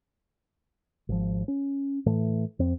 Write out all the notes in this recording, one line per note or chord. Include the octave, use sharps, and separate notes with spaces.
G#1 F3
C#4
A2 E3 A3
F2 C4